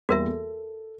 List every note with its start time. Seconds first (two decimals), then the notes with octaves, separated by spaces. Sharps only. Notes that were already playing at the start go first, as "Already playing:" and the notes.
0.09 E2 G3 A#3 F#4 A#4 E5
0.26 A4